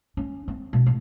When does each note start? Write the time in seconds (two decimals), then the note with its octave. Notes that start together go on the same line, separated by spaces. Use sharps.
0.17 C#4
0.48 C4
0.73 B2
0.86 A1